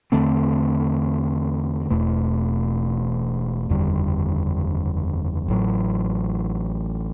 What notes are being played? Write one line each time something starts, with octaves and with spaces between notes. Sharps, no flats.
E2 D3 A3 C4
E1 E2 B2 A3
F#1 E2 D3 G3
A1 A2 F#3